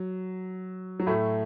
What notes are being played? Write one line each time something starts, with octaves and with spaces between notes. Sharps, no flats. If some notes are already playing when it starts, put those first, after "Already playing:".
Already playing: F#3
F#3
A2 A3